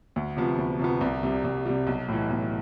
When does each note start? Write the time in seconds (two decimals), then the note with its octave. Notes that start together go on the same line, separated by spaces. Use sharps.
0.16 D2
0.37 C3 F3 B3
0.58 D2
0.79 C3 F3 B3
1.01 C2
1.23 C3 G3
1.44 C2
1.66 C3 G3
1.87 B1
2.09 A2 E3
2.30 B1